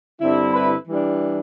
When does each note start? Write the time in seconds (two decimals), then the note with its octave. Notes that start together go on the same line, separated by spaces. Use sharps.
0.20 G2 D3 G3 C4 E4
0.53 B4 B5
0.87 E3 G3 D4